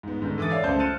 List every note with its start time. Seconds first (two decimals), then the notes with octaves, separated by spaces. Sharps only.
0.03 G#2 B3
0.22 G#2 D3 D#3
0.38 E3 A4 D6 D#6 A6
0.50 C#5 D5 E5 F5
0.63 C#2 F#2 A3 C5 A5 G6
0.79 F6 F#6 A6 C#7 D#7 E7